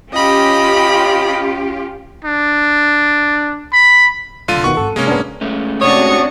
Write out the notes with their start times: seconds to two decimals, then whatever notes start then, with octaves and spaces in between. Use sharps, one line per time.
0.13 C#4 F4 G4 D#5 B5
2.24 D4
3.73 B5
4.48 D1 C2 D3 F4 D#7
4.64 D2 B2 D3 D#3 F#5 C#6
4.77 G#1 G2 A4
4.96 C3 G#3 A#3 C#4
5.07 B1 F#2 B3 D4
5.41 G#3 A3 C#4
5.81 C3 D4 F#4 C#5 C#6 D#6